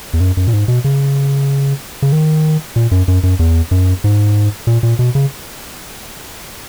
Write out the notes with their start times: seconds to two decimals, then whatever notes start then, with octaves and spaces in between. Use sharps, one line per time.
0.13 E2
0.20 F#2
0.37 F#2
0.48 A#2
0.53 G#2
0.68 B2
0.84 C#3
2.02 C#3
2.12 D#3
2.76 A#2
2.91 F#2
3.08 F#2
3.23 F#2
3.39 E2
3.71 F#2
4.04 G#2
4.67 A#2
4.83 A#2
4.99 B2
5.15 C#3